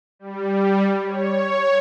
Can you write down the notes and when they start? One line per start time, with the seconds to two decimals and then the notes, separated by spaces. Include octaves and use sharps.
0.19 G3
1.05 C#5